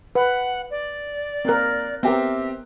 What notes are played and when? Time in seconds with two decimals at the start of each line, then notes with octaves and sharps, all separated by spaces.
0.15 B4 F#5
0.71 D5
1.45 A#3 C4 A#4 F#6
2.03 B3 C4 G4 A#4 E5